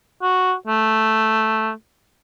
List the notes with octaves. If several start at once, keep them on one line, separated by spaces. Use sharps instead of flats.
F#4
A3